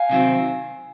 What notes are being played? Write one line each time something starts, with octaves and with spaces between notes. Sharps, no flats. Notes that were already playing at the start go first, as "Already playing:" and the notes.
Already playing: F5 G#5
C3 D#3 F#3 C4